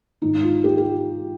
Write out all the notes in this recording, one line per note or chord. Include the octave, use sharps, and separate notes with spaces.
G#2 D#3 D#4
F4
G4
G4